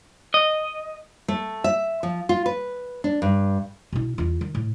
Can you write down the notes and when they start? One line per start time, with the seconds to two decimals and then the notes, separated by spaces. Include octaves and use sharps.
0.34 D#5
1.28 A3
1.64 E5
2.03 F3
2.29 F4
2.46 B4
3.04 D4
3.22 G2
3.92 B2 E4
4.18 E2 F4
4.41 D#3
4.55 A2